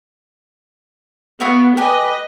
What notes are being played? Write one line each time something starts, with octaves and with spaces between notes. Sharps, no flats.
B3 E4 F#4 F5
G4 B4 D#5 G#5